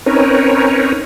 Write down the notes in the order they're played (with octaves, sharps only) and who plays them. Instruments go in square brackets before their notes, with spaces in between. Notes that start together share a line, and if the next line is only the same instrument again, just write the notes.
[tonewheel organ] C4 C#4 D#4 A#4 B4 C#5